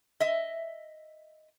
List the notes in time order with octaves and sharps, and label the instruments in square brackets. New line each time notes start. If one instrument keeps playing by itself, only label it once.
[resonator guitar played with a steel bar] D#5 E5